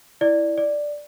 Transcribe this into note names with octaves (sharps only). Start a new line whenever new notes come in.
E4 D5
D5